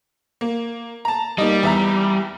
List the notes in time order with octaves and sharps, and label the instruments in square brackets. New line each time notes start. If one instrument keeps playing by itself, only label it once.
[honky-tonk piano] A#3
A5 A#5
[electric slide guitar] G3 [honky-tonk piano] A#3 D#4 D#5
[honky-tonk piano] E2 E5 A#5